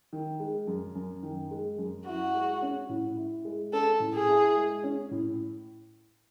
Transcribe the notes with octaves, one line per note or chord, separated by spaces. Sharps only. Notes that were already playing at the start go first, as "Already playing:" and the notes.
D#3
G#3
F#2
F#2
D#3
G#3
F#2
E4 F#4
G#3
C#4
A2
E4
G#3
C#4 A4
A2
G#4
E4
G#3
C#4
A2